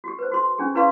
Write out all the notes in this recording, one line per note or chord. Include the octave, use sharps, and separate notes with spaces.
F#4 G4
B4 C5
D#4 F#4 A4 C6
C#4 D4 G#4
E4 G#4 B4 D5 F5 C6